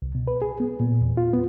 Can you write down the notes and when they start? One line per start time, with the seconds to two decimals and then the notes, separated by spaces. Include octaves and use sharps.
0.02 C2
0.15 B2
0.28 B4
0.42 G#4
0.60 B3
0.80 A#2
1.01 E2
1.17 F4
1.33 B3